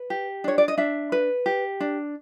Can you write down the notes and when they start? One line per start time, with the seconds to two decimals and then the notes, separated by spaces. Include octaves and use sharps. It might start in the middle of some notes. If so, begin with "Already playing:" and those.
Already playing: B4
0.10 G4
0.44 D4 C#5
0.58 D5
0.68 D#5
0.78 D4 E5
1.12 B4
1.46 G4
1.80 D4